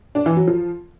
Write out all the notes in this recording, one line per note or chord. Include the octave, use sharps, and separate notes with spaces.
D4
E3
F#3
F3